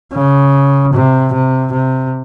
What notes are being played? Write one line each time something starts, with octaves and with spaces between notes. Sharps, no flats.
C#3
C3
C3
C3